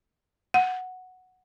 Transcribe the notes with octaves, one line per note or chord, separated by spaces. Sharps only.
F#5